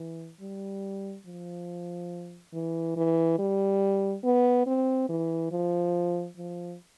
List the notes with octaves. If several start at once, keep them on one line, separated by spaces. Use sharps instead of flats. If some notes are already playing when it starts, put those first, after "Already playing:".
Already playing: E3
G3
F3
E3
E3
G3
B3
C4
E3
F3
F3